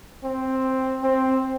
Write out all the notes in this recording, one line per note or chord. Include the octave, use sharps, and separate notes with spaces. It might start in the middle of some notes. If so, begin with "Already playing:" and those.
C4
C4